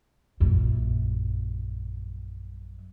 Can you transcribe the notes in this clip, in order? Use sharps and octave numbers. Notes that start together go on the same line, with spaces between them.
A#1 F#2